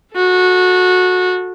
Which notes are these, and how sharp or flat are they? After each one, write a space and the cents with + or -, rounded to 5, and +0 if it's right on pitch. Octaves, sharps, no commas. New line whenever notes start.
F#4 -20 A4 +0